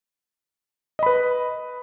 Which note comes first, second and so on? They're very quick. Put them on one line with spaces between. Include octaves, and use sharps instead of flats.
D#5 B5 B4